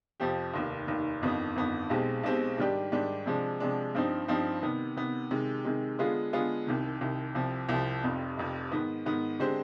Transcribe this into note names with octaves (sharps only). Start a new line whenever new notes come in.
F2 C3 F3 C4 G4
F1 D#2 D#3
F1 D#2 D#3
G1 F2 D#3 B3
G1 F2 D#3 B3
B1 B2 G#3 C4 G4
B1 B2 G#3 C4 G4
G#2 D#3 G3 D4 G4
G#2 D#3 G3 D4 G4
C3 F3 G#3 D4
C3 F3 G#3 D4
G2 F3 C4 D#4
G2 F3 C4 D#4
C3 D#3 B3
C3 D#3 B3
C3 D#3 G#3
C3 D#3 G#3
D3 G#3 B3 F4 G#4
D3 G#3 B3 F4 G#4
C2 C3 D#3
C2 C3 D#3
C2 C3 F3
C2 C3 F3
F1 F2 C3
F1 F2 C3
G#2 D#3 B3
G#2 D#3 B3
D3 G#3 C4 G4 C5